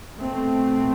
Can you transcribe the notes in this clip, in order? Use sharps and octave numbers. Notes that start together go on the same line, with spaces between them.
B2 A3 C4